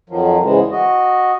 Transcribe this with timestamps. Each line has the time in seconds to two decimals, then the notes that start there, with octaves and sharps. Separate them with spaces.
0.10 F2 D#3 F3 F#3
0.42 E2 G#2 C#3 E3 G#3
0.71 F#4 D#5